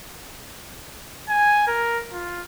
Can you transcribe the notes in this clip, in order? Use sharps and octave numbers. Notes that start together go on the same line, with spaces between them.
G#5
A#4
F4